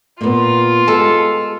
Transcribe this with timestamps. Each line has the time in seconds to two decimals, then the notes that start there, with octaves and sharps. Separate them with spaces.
0.21 A#2 B3 F4
0.88 G#3 G4 A4